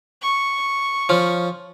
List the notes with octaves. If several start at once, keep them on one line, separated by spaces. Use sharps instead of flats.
C#6
F3 C#4